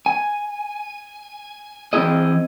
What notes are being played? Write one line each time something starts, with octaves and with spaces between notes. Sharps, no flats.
G#5
E3 C4 C#4 E4 G#4 D#5